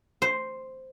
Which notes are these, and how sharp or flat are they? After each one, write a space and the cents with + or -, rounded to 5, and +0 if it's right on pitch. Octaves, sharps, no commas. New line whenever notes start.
C5 +0